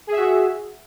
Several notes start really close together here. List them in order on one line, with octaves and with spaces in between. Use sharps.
G#4 E5 F#4